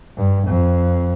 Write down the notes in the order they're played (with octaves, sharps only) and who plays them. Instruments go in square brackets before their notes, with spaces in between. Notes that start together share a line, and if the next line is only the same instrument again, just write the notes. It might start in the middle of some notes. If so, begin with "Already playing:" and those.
[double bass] G2
F2